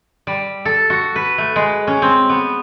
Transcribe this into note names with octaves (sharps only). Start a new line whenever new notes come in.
G3
A4
F#4
B4
A3
G#3
C#4
C4
B3